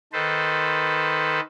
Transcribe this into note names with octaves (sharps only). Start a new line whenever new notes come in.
D#3 A4 B4 C5